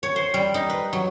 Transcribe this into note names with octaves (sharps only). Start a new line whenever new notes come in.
C#5
C5
G3
D#4
B4
F#3